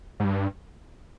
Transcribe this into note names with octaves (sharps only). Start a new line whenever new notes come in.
G#2
G2